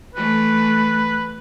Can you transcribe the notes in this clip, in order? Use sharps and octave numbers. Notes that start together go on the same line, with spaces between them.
E3 A3 B4